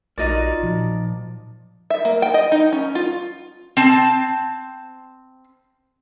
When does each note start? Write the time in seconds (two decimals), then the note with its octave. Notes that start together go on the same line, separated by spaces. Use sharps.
0.18 A#1 D#4 F4 F#4 A#4 D5
0.63 A#2 F3
1.90 E5
2.05 A#3
2.22 G5
2.34 D#5
2.52 D#4
2.72 C#4
2.95 F4
3.77 C4 A5